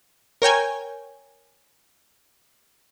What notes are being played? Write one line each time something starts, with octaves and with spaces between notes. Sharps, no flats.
A#4 C#5 G5 G#5